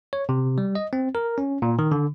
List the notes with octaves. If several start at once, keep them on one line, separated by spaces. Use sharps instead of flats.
C#5
C3
G3
D#5
C4
A#4
C#4
A#2
D#3
D3